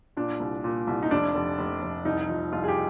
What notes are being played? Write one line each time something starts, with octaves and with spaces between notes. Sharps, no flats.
A#2 D4
C2
A#2
C2
D#4
F1 D4
F1
F1
F1
C2 D#4
F3
C2 F4
G#4
G4